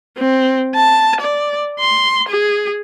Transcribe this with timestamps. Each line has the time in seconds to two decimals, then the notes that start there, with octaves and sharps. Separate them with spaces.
0.18 C4
0.75 A5
1.21 D5
1.80 C6
2.29 G#4